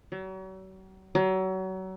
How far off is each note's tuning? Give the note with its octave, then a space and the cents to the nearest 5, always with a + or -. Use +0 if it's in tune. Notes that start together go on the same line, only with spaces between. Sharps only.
F#3 +40
F#3 +30